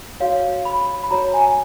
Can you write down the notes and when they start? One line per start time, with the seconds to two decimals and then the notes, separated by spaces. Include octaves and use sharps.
0.20 F#4 C#5 F5
0.65 B5
1.04 B5
1.11 F#4 C#5 A#5
1.34 G#5